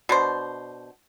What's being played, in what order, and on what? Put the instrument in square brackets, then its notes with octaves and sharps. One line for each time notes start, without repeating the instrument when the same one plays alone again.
[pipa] B2 D4 C5